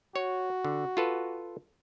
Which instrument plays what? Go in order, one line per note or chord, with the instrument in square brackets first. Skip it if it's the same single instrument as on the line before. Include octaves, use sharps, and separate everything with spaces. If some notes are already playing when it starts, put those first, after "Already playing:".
[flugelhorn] F#4 [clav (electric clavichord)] C#5
[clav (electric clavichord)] D3
F4 A4 B4